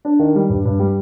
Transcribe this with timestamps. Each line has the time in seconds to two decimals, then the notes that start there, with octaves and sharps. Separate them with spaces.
0.05 D4
0.19 D#3
0.35 G3
0.50 G2
0.65 G2
0.79 G3